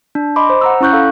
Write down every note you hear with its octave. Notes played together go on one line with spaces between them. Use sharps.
D4
D#5 B5 C6 D6
C5
F#5 A#5 E6
C#4 E4 C#6 F#6 G6
A4 F5